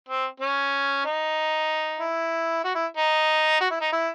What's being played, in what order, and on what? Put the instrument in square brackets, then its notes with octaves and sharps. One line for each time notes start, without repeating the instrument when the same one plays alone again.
[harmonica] C4
C#4
D#4
E4
F#4
E4
D#4
F#4
E4
D#4
E4